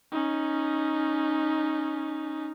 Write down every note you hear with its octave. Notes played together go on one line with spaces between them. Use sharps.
C#4 D#4